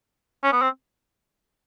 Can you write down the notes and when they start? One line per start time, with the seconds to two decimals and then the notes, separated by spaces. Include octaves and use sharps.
0.44 C#4
0.52 B3
0.62 C4